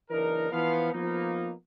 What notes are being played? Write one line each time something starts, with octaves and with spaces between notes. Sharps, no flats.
F#1 E3 D4 D#4 A#4
E3 F3 B3 F5
F3 A#3 B3 D#4